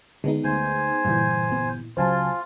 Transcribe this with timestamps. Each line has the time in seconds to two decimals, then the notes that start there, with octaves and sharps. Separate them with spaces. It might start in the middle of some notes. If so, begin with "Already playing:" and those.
0.24 D3 G#3 B3 D#4
0.44 D2 C5 G#5
1.05 G2 A#2 D3 E3
1.49 G1 B3
1.97 C#2 C#3 F#3 F4 C5 G#5 A5